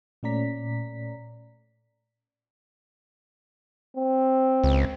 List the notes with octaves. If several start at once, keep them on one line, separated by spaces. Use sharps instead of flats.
A#2 A3 C#4 D5 A#5 B6
C4
C#2